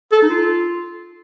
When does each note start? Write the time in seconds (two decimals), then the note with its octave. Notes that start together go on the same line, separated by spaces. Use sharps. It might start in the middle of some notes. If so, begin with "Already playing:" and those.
0.12 A4
0.22 D#4
0.30 F4